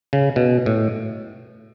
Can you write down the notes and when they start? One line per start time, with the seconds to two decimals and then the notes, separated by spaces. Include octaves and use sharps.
0.13 C#3
0.36 B2
0.66 A2